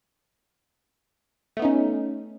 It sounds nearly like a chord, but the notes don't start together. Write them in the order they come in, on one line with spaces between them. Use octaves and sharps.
A3 B3 D#4 C#4